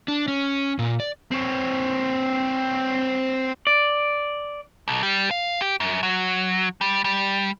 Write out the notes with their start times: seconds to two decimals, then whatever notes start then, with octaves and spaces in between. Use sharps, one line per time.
0.08 D4
0.28 C#4
0.79 A#2
1.00 D5
1.31 C4 C#5
3.67 D5
4.88 B1
5.03 G3
5.31 F5
5.61 G4
5.80 F#2
6.03 F#3
6.81 G3
7.04 G3